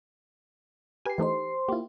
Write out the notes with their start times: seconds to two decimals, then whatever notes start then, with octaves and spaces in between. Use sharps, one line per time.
1.06 G4 B4 G#5 C7
1.18 E3 A3 D#4 C5 C6
1.69 A#3 E4 F4 G4